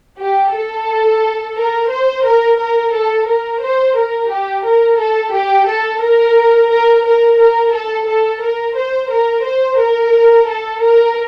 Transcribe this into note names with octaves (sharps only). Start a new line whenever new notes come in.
G4
A4
A#4
C5
A#4
A#4
A4
A#4
C5
A#4
G4
A#4
A4
G4
A4
A#4
A#4
A#4
A#4
A4
A4
A#4
C5
A#4
C5
A#4
A4
A#4